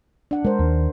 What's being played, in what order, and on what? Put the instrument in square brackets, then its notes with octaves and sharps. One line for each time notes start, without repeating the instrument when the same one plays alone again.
[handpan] D4 F#5
[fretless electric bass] G#3 D4 [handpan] A#4 C5
[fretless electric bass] D#2